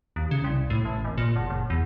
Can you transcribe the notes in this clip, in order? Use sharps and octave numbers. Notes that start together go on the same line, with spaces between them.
D#2
C#3
C2
A2
A1
G#1
A#2
F#1
F#1
E2